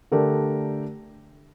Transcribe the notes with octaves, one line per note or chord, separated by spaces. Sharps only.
D3 A3 D4 G4 A#4